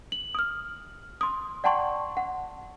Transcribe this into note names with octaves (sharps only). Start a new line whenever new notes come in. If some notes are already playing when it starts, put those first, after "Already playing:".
F#7
D#6 F6
C6 D#6
D5 F#5 G5 A5 C6 C#6
F#5